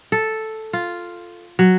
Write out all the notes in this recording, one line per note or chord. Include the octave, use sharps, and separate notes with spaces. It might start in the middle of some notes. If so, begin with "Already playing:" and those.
A4
F4
F#3